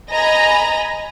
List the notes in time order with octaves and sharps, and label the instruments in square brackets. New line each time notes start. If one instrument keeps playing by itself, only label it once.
[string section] D#5 G#5 A#5 B5